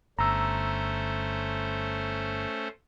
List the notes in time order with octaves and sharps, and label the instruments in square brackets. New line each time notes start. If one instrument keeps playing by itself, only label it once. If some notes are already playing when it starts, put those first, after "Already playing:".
[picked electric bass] G1 [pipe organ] A3 C#4 C5 [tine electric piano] A#5 E6